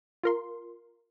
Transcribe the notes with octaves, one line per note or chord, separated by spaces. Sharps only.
F4 A#4 C6